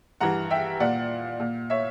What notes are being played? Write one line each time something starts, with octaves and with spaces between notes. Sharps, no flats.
G2 E3 F#5 A#5
E5 G5
A#2 D5 F#5
A#2
C#5 E5